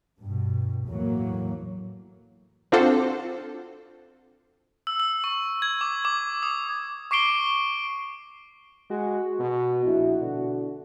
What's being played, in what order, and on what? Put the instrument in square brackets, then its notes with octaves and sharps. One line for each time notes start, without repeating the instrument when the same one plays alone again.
[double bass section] G2 B2
E2 A2 E3 F#3 A#3
[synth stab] C4 D4 F4 F#4 A4 C5
[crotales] E6
E6
C#6
G#6
D6
D6
D#6
C#6 D6 C7 D7 G7
[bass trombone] G#3 [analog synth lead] F#4
[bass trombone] B2 [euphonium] B3
[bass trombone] A#1 [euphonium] E4
[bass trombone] B2 [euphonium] D3